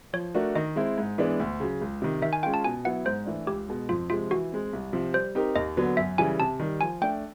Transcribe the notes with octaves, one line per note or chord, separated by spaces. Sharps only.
F3 C#5
A3 D4 F#4 A#4
D#3 D#5
G#3 C4 E4
G#2
E3 G#3 B3 D4
D2
C#3 F#3
C#2
C3 D#3
D#3 E5
G#5
G#3 C#4 F4 G5
A5
B2 G#5
F#3 B3 E4 F#5
G#2 C5
E3 A3 D4
C#2 G4
B2 G#3
F2 F4
C3 F3 G#3 F4
E3 F#4
G#3 C4
C2
C3 F3
G3 C5
C4 D#4 G4 A#4
D#2 D#5
D3 F#3 B3
F#2 E5
C#3 E3 G3 G#5
C3 A5
D#3 G3
F3 G#5
A3 D4 G5